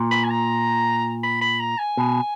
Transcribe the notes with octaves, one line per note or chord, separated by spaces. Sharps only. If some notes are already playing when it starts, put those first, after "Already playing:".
Already playing: A#2
B5
G#5
A#5
B5
B5
A#5
G#5
B2